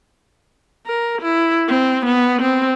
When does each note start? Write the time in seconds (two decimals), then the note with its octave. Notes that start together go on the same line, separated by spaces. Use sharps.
0.87 A#4
1.22 E4
1.68 C4
2.05 B3
2.42 C4